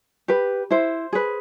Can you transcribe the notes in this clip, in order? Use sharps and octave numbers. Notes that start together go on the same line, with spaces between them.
G4 B4
E4 C5
G#4 B4